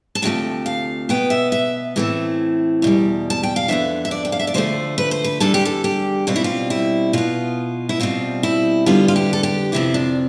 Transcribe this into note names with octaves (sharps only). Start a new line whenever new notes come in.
A5
D2 C3 F3 A3 G5
F5
B2 B3 G5
E5
E5
A2 E3 A3 C4
E2 B2 G3
A5
G5
F5
F2 D3 F3 B3 E5
E5
D5
G5
F5
E5
D5
D2 D3 F3 A3 C5
B4
C5
B4
E2 D3 G3 A4
G4
A4
G4
B2 G3 C4 F4
E4
F4
E4
B2 B3 F4
E4
B2 G3 C4 F4
E4
F2 D3 G3 B3 F4
F4
G4
A4
G4
F2 C3 F3 C4 E4
D4